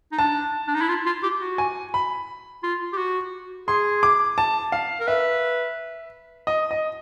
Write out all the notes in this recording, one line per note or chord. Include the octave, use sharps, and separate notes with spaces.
D#4
D4 A5
D4
D#4
E4
F4
F4
G4
F#4
G#5
B5
F4
G4
F#4
G#4 C6
D6
A5
F5
A#4
B4 E5
D#5
D#5